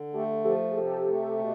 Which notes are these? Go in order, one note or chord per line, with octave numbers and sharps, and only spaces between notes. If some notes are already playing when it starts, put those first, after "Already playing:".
Already playing: D3
A3 G4 A4
F3 G4 A4
G#4
C3 G4 A4
A3
B2